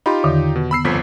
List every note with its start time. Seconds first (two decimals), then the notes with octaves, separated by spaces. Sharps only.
0.06 D#4 F4 G4 B5 C6
0.24 E2 D3 D#3
0.56 B2
0.71 B3 B5 E6 C7
0.84 G1 F2 B6